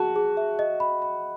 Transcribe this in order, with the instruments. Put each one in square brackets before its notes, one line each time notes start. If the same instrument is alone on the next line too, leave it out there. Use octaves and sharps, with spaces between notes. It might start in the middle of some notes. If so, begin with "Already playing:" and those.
Already playing: [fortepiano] F#4 [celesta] G#4 A5
[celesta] G#4
E5
D#5
B5
B5